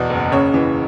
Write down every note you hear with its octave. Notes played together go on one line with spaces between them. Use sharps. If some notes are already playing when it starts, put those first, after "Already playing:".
Already playing: E2 B2 D5
F#1
C#3 C#5
E3